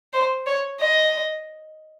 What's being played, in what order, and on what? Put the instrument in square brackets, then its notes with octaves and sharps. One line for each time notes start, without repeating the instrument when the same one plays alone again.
[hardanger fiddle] C5
C#5
D#5